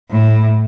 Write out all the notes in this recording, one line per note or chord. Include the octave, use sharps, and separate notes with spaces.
A2